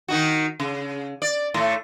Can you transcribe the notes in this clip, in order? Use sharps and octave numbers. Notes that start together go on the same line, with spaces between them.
D#3 D#4 F#4
C#3
D5
A2 A3